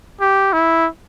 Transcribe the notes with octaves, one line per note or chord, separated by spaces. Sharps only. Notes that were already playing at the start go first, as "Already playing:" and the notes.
G4
E4